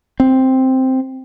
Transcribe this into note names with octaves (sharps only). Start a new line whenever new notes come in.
C4